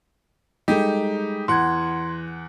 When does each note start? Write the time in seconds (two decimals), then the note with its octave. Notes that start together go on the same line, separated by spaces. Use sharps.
0.68 G3 G#3 D#4 G4 A4
1.48 E2 E3 F#5 C6 G#6